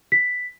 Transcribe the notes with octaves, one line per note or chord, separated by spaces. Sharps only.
B6